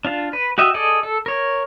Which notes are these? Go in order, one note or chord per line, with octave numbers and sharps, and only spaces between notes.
D4 F4 F5
B4
F#4 G4 D#5 E5
G#4 A4 D5 D#5
A4
A#4 C#5